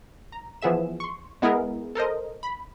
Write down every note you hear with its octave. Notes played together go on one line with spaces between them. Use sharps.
A#5
E3 F3 B3 G#4 E5 E7
C6 C#6
G#3 B3 E4 G#4 A#4
A4 A#4 C5 D#5
B5